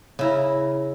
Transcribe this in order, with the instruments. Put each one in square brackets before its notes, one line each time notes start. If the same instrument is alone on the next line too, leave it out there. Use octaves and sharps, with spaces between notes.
[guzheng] C#3 E4 A#5